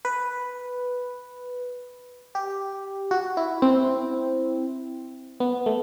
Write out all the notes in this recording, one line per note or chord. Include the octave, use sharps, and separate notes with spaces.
B4
G4
F#4
E4
C4
B3
A3